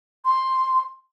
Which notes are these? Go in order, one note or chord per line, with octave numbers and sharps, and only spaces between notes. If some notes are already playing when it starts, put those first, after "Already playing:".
C6